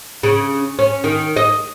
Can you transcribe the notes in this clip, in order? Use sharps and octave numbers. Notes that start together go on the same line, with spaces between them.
C#3
C#4
D#3
D#5